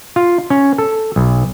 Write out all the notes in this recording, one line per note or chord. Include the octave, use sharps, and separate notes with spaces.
F4
C#4
A4
B1